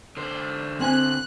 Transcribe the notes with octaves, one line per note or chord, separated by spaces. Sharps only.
D3 C5 D5
C4 G#5 F#6